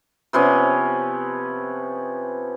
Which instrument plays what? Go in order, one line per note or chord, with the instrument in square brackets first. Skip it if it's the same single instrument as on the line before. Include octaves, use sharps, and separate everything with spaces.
[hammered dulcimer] C3 F3 B3 C#4